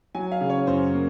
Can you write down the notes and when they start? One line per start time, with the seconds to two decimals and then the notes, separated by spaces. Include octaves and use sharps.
0.15 F#3 G#5
0.32 F5
0.41 C#3
0.49 C#5
0.67 F#2 C5
0.94 A#3